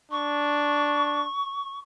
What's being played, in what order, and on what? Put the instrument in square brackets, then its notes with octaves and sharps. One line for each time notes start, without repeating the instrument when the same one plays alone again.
[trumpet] D4 [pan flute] C#6